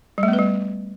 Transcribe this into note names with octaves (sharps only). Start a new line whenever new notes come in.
G3
A3
B3
B4
G3